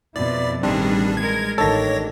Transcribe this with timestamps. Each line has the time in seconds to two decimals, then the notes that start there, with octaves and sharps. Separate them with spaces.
0.16 F2 B2 E4 D5
0.63 A1 D#3 G3 C4 D4 G#4
1.17 G#3 A#4 G#6
1.58 A1 D#3 D4 A4 C#5 A#6